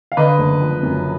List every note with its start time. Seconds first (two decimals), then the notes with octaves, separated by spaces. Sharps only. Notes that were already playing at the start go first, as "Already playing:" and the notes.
0.12 F5
0.17 D3 B4 D#5
0.39 F#1
0.61 F3
0.83 F#2